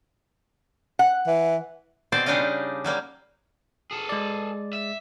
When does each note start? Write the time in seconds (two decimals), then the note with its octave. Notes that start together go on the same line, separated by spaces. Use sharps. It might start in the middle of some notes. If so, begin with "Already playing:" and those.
0.99 F#5
1.27 E3
2.12 B2 C4 C5 D5
2.26 C#3 G3 D4 D#4 D#5 F5
2.84 F#3 G3 A#3
3.91 G#4 A4
4.09 G#3 D5
4.73 E5